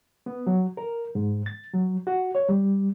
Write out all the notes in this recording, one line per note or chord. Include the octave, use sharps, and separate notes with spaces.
B3
F#3
A#4
G#2
A6
F#3
F#4
C#5
G3